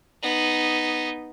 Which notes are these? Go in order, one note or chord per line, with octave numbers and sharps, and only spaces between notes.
B3 D#4